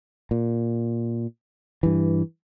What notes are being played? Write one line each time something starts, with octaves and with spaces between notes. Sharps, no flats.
A#2
G2 E3